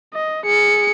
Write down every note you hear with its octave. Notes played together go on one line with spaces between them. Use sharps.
D#5
G#4 C#7